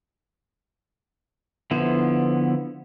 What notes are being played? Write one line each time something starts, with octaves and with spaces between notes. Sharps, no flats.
D3 F3 B3 E4 C5